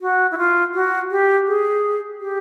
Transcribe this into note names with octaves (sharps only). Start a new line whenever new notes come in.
F#4
E4
F4
F#4
G4
G#4
G4